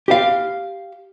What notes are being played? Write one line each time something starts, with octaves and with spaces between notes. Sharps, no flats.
G4 F5